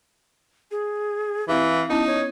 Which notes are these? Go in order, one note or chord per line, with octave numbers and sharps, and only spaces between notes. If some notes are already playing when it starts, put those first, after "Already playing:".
G#4
E3 C4 E4 G4 F5
B3 C#4 D#4 E4 A5
C#5